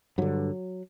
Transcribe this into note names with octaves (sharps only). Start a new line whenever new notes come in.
G2 D3 F#3